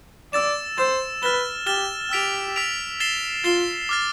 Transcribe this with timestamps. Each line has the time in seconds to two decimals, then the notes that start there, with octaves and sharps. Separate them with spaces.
0.33 D5 E6 A6 E7
0.78 C5 E6 A6 E7
1.22 B4 F6 A6 E7 G7
1.67 G4 F6 A6 E7 G7
2.11 G4 E6 B6 D7 F7
2.56 E6 B6 D7 F7
3.00 A6 C7 E7 G7
3.44 F4 A6 C7 E7 G7
3.89 D6 F6 A6